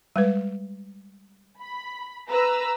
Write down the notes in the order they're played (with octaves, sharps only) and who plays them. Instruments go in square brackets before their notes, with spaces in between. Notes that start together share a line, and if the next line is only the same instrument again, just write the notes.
[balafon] G3 G#3 B4
[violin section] B5
B4 A#5 E6